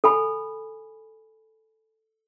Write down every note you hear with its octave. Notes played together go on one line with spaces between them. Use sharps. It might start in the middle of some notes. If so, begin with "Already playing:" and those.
A4 G#5 B5